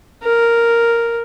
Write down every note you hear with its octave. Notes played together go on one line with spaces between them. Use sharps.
A#4